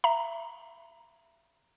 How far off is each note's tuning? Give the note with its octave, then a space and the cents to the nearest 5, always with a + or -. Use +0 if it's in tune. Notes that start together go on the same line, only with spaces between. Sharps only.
E5 +30 A#5 +0